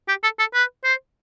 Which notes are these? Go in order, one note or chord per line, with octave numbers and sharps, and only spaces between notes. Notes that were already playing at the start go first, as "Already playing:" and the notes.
G4
A4
A4
B4
C5